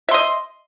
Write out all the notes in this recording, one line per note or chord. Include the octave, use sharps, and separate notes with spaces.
D#5 E5 C6